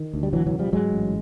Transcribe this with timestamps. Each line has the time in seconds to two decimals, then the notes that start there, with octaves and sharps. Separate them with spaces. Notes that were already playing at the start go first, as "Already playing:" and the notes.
Already playing: D#3
0.14 D2
0.23 G3
0.33 E1 E3 F#3
0.47 E3 F#3
0.52 C#3
0.59 F3 G3
0.73 G#2 F#3 G#3
0.92 A1